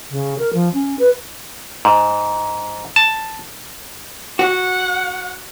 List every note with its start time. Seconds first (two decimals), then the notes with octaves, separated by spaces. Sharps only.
0.11 C#3
0.38 A#4
0.54 F3
0.74 C#4
0.99 B4
1.85 G#2
2.96 A5
4.39 F#4 F#5